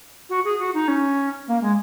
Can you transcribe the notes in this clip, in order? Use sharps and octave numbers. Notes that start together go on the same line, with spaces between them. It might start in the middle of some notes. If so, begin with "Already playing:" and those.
F#4
G#4
F#4
D#4
C#4
A#3
G#3